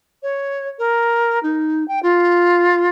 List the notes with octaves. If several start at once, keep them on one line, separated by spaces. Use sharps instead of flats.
C#5
A#4
D#4
G5
F4